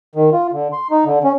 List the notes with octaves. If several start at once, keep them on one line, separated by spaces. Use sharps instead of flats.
D#3
F4
D3
C6
D#4
D3
C#4